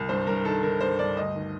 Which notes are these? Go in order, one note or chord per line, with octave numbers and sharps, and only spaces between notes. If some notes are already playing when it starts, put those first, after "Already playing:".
Already playing: C2
G2 C5
G2 A#4
D#3 A4
D#3 A#4
G2 C5
G2 D5
D2 D#5
D#3